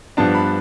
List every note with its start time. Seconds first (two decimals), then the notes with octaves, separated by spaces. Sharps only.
0.17 G2 F3 B3 D4 A5
0.35 B5